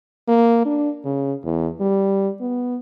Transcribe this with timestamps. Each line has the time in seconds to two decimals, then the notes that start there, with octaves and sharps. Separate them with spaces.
0.28 A#3
0.66 D4
1.05 C#3
1.45 E2
1.81 G3
2.41 B3